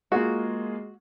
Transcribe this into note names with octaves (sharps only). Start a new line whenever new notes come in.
G#3 A#3 F4 F#4 G#4